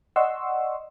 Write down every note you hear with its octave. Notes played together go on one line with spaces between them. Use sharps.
D5 D#5 F#5 C6 C#6 E6